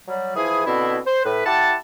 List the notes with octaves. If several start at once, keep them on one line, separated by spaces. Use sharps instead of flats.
F#3 G3
E3 F3 E4 G#4
B2 D3 C4 E4
C5
A2 B4
E4 G4 F#5 A5